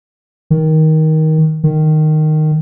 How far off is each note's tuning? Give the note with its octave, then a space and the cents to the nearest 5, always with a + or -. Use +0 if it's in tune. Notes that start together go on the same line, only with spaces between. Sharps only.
D#3 +15
D#3 -10